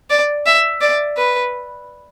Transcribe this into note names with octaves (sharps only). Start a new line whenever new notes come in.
D5
E5
D5
B4